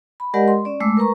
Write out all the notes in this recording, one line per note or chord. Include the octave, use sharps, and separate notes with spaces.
B5
G#3 G4 A#4 D5 D#5 F#5
C6
C#4 D5
G#3 A3 D6 E6
A#4 B4 A#5 C#6